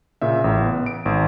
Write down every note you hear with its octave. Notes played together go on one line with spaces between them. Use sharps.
A#2 C#3 E5
A1
B3
D7
G#1